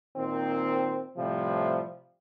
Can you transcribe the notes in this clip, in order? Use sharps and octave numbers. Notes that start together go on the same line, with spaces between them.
A#2 D#3 C4
A2 C3 F3 G3